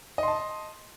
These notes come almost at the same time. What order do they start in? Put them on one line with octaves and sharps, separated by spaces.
D#5 C6 A5